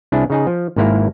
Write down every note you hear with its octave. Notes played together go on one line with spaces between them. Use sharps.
C2 D4 E4 G#4
C#3 D#4 G#4
F3
G#1 G#2 A#3 E4 A#4